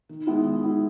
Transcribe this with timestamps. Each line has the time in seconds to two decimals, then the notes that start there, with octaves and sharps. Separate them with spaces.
0.09 D#3
0.27 G#3 B3 E4
0.44 D#3
0.63 G#3 B3 E4